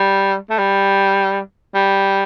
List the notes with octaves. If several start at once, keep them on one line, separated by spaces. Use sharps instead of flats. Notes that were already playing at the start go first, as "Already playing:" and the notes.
Already playing: G3
A3
G3
G3